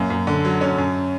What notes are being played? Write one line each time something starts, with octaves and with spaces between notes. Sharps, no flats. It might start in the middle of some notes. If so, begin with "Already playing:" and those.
Already playing: F#2 A#3
F#2
D3
F#3
C#4
F#2